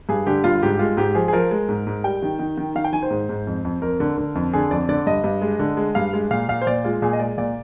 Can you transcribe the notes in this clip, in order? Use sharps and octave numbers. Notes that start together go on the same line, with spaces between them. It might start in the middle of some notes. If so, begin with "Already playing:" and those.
G2 G#4
D3 G4
G2 F4
G#2 G4
G#3 F4
G#2 G4
F3 G#4
G#4
F3 A#4
G#3
G#2
G#2
G3 G5
D#3
D#3
D#3
D#3 F5
G5
D#3 G#5
C5
G#2
G#2
F2
F2
F2 A#4
D3
D3
F2
D3 G#4
F2 D5
D3 D5
G2 D#5
G2
G#3
D3
G#3
G2 F5
G#3
A#2 F5
A#2 F5
C5
A#2 D5
G#3 F4
A#2 G#4
D#5
G#3 D5
A#2 D5